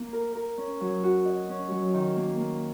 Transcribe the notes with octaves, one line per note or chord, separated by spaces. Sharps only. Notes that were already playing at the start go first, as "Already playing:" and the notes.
Already playing: A#3
A#4
A#4
C#4
F#3
F#4
D#5
C#4
F#3
D#3
A#3
A#3